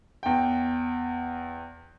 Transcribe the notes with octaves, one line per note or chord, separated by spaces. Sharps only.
E2 G5